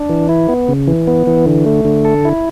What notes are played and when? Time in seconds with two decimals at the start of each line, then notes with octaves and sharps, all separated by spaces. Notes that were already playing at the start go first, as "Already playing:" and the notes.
Already playing: D4
0.09 E3
0.29 E4
0.48 B3
0.68 C#3
0.87 E3
1.07 B3
1.27 E3
1.46 D3
1.66 A3
1.85 D3
2.05 A4
2.25 E4